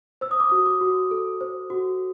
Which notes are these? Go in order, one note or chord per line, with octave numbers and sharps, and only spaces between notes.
C5 E6
D#6
D6
F#4 D#6
D6
F#4
A4
C5
F#4